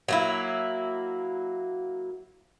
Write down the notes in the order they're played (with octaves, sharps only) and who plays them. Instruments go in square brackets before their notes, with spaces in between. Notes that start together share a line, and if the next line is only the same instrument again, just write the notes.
[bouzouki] F#3 A#3 E4